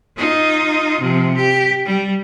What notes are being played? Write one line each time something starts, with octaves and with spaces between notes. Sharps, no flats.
D#4 F4
C3 F3
G4
G3